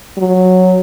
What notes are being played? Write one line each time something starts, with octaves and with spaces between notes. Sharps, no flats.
F#3